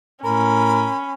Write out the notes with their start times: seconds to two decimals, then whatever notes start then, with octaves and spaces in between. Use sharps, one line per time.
0.24 A2 C#4 A#4 B5